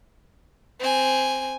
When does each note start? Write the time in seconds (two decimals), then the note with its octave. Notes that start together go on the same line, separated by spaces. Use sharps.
0.80 C4 G#5